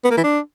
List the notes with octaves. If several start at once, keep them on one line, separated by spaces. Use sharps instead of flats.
B3
A#3
E3
D4